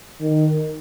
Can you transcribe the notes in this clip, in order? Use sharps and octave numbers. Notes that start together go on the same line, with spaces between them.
D#3